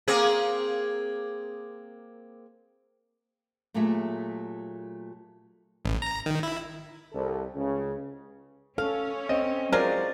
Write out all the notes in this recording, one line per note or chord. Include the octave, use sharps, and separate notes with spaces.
A#3 C4 G#4
A#2 F#3 A3 G4 G#4 E5
A1
A#5
D#3
E4
C2 A4
C#2 C#3
C#4 A4 F5
C4 D#5
F#3 G#3 F4 A#4 C5 D5